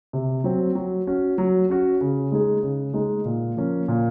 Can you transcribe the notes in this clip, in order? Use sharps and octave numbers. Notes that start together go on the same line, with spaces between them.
C3
F#3 C4
F#3
C#4 F#4
F#3
C#4 F#4
C#3
G#3 D#4 G#4
C#3
G#3 D#4 G#4
A#2
F3 A#3 C#4
A#2